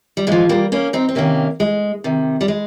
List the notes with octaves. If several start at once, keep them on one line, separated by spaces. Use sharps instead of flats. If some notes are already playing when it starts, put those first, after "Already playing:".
G3
A#2 F3 G#3
G3 A#3
A#3 C#4
C4 D#4
C4
C3 D#3 A#3 C#4
G#3
C3 D#3
G3
G#3